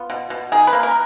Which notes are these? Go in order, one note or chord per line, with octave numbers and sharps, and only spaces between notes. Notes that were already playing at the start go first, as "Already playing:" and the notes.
Already playing: B3 F4
B2
B2
D#3 G#4
B4
A#3
A#4